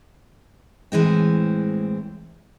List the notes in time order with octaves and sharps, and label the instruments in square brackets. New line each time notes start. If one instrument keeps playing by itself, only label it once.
[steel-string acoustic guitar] A2 E3 G#3 C4